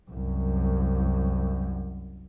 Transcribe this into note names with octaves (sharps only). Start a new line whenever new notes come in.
C2 F#2